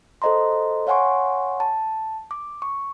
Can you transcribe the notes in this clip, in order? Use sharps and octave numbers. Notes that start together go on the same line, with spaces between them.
A4 C5 D#5 A#5 C6
C#5 F5 F#5 G#5 C6 C#6
A5
D6
C#6